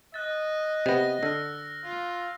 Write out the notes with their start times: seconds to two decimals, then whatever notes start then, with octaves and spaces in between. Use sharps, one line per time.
0.14 D#5 F#6 A6
0.86 C3 B3 A#6
1.23 D3 E6 F6
1.84 F4